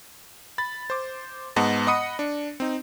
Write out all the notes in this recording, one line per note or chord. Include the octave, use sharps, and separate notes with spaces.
B5 A6
C5 D6
G#2 B3 D#5 F#5 A5 A#6
D#5 F#5 B5 D#6 C#7 D#7
D4
C4 D#4